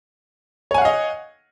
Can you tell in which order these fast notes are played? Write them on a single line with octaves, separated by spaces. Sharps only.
C#5 G#5 F#5 F5 D#5